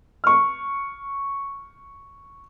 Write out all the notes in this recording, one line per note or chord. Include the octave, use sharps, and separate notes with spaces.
C#6 F6